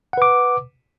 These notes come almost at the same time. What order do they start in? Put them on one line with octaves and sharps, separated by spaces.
F#5 B4 D6